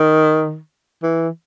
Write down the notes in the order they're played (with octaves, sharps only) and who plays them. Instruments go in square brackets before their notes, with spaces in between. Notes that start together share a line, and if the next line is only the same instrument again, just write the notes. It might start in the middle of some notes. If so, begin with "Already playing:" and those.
Already playing: [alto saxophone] D#3
E3